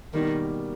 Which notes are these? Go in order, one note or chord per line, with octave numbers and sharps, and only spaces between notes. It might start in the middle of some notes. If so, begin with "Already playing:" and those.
B2 D#3 G3 A#3